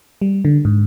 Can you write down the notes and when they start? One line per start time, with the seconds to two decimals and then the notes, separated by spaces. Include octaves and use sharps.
0.22 G3
0.45 D3
0.65 G#2